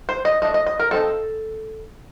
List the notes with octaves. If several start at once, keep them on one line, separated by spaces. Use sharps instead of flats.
C5
D#5
A3 D4 D#5
D#5
D#5
A#4
F3 C4 D#4 A4